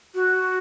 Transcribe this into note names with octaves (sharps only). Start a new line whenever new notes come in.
F#4